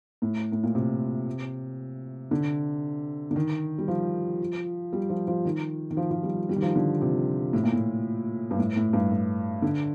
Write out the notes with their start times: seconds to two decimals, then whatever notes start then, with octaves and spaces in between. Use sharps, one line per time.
0.22 A2
0.52 A2
0.63 A#2
0.75 C3
2.31 D3
3.31 D3
3.36 D#3
3.78 G3
3.88 F3
4.93 G3
5.10 F3
5.27 F3
5.45 D#3
5.91 D#3
5.97 F3
6.11 F3
6.23 G3
6.49 G3
6.56 D#3
6.62 F3
6.76 D3
7.01 C3
7.53 A2
7.63 A#2
7.72 A2
8.51 G2
8.59 A2
8.76 A2
8.93 G2
9.11 A2
9.62 D3